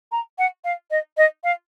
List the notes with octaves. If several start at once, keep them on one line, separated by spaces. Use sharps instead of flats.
A#5
F#5
F5
D#5
D#5
F5